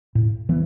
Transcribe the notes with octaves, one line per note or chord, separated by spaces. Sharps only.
A2
E3 B3